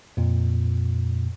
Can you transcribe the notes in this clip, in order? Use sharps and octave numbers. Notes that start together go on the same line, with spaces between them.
F2 A#2